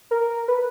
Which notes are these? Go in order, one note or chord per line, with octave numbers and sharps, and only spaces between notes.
A#4
B4